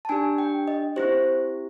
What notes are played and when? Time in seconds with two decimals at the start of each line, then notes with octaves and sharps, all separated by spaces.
0.05 A5
0.09 D4 G4 G#5
0.38 G5
0.68 D#5
0.96 C4 E4 G4 C5